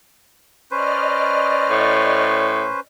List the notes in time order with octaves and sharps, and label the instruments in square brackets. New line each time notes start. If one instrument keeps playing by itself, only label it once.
[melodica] C#4 B4 C5 [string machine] D5 D#5 F6
[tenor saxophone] A2